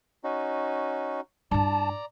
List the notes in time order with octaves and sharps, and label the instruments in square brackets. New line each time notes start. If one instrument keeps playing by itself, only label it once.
[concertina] C#4 D#4 F#4
[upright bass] G2 E4 [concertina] D5 A#5 [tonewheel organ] A5